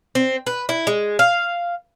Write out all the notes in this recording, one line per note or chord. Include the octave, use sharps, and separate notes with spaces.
C4
B4
E4
G#3
F5